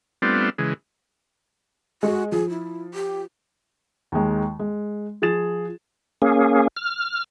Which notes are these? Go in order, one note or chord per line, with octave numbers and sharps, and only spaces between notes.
G3 A3 B3 C4 D4 F4
C#3 E3 G#3
G#3 F#4
F3 G#4
E4
G4
D#2 D#3 G#3
G#3
F3 G#4 A6 E7
A#3 C#4 G#4
F6